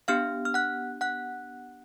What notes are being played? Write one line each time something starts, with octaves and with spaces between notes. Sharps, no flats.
B3 D4 G4 F5 F6
F6
F#5 F#6
F#5 F#6